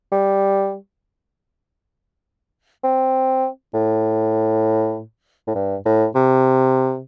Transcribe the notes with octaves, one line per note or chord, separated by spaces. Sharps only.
G3
C4
A2
A2
G2
A2
C3